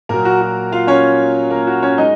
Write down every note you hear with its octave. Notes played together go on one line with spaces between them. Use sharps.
A#2 F#3 A#3 A#4
F#4
F#4
F4 F5
C#4 C#5
A#3 A#4
F#4
C#4 C#5
G#3 D#4 D#5